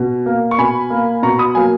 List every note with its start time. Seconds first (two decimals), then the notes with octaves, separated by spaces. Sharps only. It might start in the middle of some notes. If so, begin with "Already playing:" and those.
Already playing: B2
0.26 A#3
0.51 C#6
0.58 B2 G#5 B5
0.90 A#3
1.22 B2 A#5 C#6
1.38 B5 D#6
1.55 F#3 A#3 F5 G#5